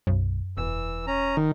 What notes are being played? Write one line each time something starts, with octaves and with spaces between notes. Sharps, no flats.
B1 F#2
E1 E3 E6
C#4 A#5
D#3